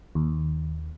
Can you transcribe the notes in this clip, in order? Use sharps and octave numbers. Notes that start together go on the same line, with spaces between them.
D#2